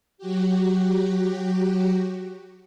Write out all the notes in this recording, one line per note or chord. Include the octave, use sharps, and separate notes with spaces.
F#3 F#4 G4